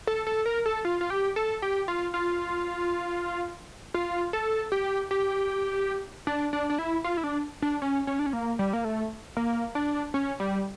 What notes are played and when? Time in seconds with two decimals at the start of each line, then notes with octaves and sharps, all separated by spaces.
0.07 A4
0.27 A4
0.46 A#4
0.66 A4
0.85 F4
1.01 F4
1.10 G4
1.36 A4
1.62 G4
1.88 F4
2.14 F4
3.94 F4
4.33 A4
4.72 G4
5.11 G4
6.27 D4
6.53 D4
6.70 D4
6.79 E4
7.04 F4
7.17 E4
7.24 D4
7.62 D4
7.82 C#4
8.07 C#4
8.19 D4
8.26 C#4
8.33 A#3
8.59 G3
8.73 A#3
8.85 A3
9.37 A#3
9.75 D4
10.14 C#4
10.40 G3